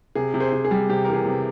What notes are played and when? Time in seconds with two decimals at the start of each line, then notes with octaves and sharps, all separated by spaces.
0.15 C3 G#4
0.34 C3
0.40 G#4 C5
0.53 C3
0.65 G#4
0.71 G3
0.89 C3 G4
1.05 E3 A#4
1.13 G#4
1.26 C3